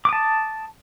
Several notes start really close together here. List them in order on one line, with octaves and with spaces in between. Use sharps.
D6 D#6 A5